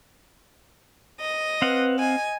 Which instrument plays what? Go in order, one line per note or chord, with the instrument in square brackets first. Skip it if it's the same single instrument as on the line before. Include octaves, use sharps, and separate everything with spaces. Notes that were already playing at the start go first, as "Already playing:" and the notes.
[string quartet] D#5
[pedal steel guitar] C4 F5 F#5 [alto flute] B4
[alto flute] D#5 [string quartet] G#5